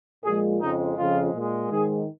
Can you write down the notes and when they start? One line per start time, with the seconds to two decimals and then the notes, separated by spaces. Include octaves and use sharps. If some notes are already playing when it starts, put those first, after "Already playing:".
0.24 A#2 F3 G#3 G#4
0.61 F2 C#3 F3 G#3 D#4
0.97 F2 C#3 F3 G#3 F4
1.34 A#2 G#3
1.70 G#2 D#3 G#3 G#4